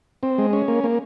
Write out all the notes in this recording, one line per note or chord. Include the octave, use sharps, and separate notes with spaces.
C4
G#3
C#4
A#3
A#3